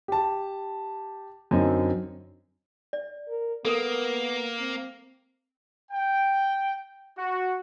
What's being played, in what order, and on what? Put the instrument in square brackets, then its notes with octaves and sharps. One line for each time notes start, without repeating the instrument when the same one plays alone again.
[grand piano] G4 A5
F#2 D3 C4 D#4
[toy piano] D5
[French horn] A#4
[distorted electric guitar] A#3 [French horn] B3 [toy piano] A4 A#4 D#6
[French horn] C4
[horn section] G5
F#4